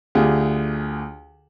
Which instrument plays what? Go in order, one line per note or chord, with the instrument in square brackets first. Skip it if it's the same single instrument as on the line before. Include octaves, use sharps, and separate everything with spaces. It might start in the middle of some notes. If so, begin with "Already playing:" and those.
[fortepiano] D2 F4 G4 G#4